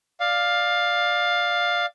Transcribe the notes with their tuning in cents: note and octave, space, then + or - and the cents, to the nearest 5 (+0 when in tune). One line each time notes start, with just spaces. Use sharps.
D5 +10 F5 +10